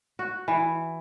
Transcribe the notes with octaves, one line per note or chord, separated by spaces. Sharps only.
F#4
E3